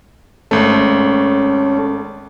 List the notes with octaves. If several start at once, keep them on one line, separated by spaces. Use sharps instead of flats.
G#1 A3 C#4 A4